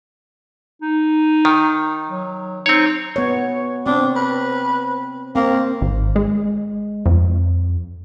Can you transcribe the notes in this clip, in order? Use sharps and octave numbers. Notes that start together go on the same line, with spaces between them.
D#4
D#3
F#3
C4 D#4 C#5
B3 C#5
C4 D4
B4
A#3 C4
G#1
G#3
F2